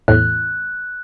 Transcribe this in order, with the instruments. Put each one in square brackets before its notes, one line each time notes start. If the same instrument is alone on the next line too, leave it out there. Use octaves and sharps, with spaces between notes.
[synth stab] E2 A2 [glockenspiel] F#6